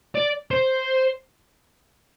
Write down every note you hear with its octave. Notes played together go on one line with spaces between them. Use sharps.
D5
C5